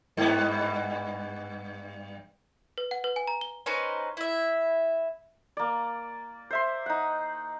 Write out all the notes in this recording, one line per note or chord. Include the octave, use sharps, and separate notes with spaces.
G2 B3
B4
F#5
B4
G#5
A#5
G7
C#4 D#4 B4 C5
E4 E5
A#3 D5
C5 E5 C6
D#4 F#5